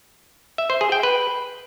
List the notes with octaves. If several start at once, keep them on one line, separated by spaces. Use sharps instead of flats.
E5
C5
G#4
G5
B4